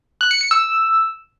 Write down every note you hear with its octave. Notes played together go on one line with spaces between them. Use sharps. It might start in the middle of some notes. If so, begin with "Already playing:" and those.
F#6
C#7
C#7
E6